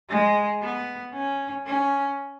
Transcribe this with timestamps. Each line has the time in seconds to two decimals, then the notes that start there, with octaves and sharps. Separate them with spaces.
0.09 G#3
0.62 B3
1.14 C#4
1.67 C#4